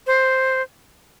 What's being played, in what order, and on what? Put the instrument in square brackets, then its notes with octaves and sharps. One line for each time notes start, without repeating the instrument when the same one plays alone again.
[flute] C5